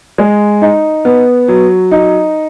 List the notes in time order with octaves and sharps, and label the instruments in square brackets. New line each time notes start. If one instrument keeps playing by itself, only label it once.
[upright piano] G#3
D#4
B3
F#3
D#4